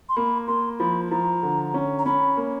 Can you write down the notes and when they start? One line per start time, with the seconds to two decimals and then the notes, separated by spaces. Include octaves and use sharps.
0.09 C6
0.16 A#3 B5
0.47 A#3 C6
0.79 F3 B5
1.11 F3 A#5
1.43 D3
1.74 C#4
1.99 A#5
2.06 C#4 B5
2.37 A#3